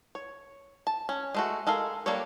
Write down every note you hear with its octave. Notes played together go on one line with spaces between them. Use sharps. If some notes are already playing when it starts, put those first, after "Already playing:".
C#5
A5
C#4
G#3 A3 F#4
G#3 A4 A#4 F5
G3 A#3 D4 A4 C#5